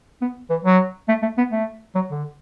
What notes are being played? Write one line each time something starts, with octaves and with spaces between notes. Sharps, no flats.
B3
E3
F#3
A3
A3
B3
A3
F#3
D3